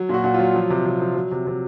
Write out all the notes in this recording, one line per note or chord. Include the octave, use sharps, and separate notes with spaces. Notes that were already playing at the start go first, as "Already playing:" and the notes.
Already playing: F#3
A#2 F#4
A#2 F#4
F#3 F4
F3
C3
C3
F3
F#3
C3
C3